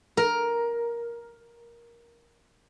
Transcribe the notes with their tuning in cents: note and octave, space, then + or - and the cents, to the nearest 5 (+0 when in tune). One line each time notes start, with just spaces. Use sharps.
A#4 +10